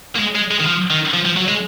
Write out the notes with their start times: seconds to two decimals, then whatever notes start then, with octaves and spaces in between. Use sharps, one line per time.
0.16 A#3
0.19 G#3
0.36 G#3
0.51 G#3
0.60 D#3
0.66 F3
0.90 D#3
1.14 F3
1.25 F3
1.37 F#3
1.48 G#3